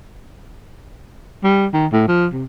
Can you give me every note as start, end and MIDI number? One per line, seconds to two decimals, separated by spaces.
1.44 1.67 55
1.73 1.87 51
1.92 2.04 45
2.08 2.27 53
2.33 2.44 48